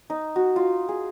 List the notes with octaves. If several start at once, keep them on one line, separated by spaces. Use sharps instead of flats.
D#4
F#4
F4
G#4